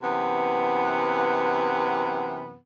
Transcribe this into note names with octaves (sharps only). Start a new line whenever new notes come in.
F#2 C3 E3 B3